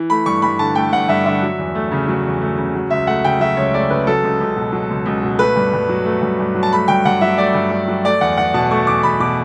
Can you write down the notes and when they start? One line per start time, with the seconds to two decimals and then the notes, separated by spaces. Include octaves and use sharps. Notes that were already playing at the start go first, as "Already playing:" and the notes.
Already playing: E3
0.10 A3 B5
0.26 G2 C#6
0.42 G2 B5
0.59 D3 A5
0.75 A3 G5
0.92 G2 F#5
1.08 G2 E5
1.25 D3 E5
1.42 F#3
1.58 E2
1.75 A3
1.91 C#3
2.08 F#3
2.25 E2
2.41 A3
2.58 C#3
2.75 F#3
2.91 C#2 E5
3.07 A3 F#5
3.24 C#3 G5
3.40 F#3 E5
3.57 C#2 C#5
3.74 A3 D5
3.90 C#3 B4
4.07 F#3 A4
4.24 C#2
4.41 C#2
4.56 B2
4.73 F#3
4.90 C#2
5.06 C#2
5.23 B2
5.39 A3 B4
5.56 G2
5.73 G2
5.89 F#3
6.06 A3
6.22 G2
6.39 G2
6.55 F#3
6.63 A5
6.72 A3 B5
6.88 G2 G5
7.05 G2 F#5
7.21 F#3 E5
7.38 A3 D5
7.55 G2
7.71 G2
7.88 F#3
8.04 A3 D5
8.21 E2 F#5
8.37 E2 F#5
8.54 B2 A5
8.71 A3 C#6
8.87 E2 D6
9.03 E2 B5
9.20 B2 D6